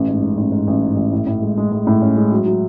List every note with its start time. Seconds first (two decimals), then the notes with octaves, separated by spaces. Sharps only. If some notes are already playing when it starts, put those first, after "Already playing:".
Already playing: A1
0.08 G#2
0.22 G#2
0.37 A1
0.52 G#2
0.67 A1
0.82 G#2
0.97 A1
1.12 A2
1.27 A2
1.42 G#3
1.57 G#3
1.72 G#3
1.87 A2
2.02 C#4
2.17 G#3
2.32 F#3
2.46 F#3